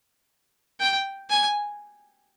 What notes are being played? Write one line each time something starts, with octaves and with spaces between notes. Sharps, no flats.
G5
G#5